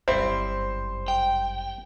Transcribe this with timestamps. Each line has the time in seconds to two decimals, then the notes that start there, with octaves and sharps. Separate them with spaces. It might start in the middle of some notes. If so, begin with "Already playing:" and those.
0.08 G1 F#2 G3 C4 E4 C5
1.08 G5